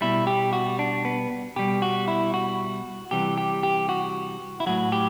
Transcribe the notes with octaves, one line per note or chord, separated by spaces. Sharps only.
B2 G3 E4
G4
F#4
D4
B3
B2 G3 G4
F#4
E4
F#4
C3 E3 G3 G4
G4
G4
F#4
E4
A2 F#3 F#4
G4